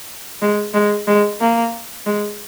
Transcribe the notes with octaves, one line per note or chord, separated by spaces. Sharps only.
G#3
G#3
G#3
A#3
G#3